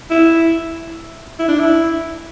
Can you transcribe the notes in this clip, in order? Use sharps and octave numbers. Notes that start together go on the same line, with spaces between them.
E4
E4
D4
E4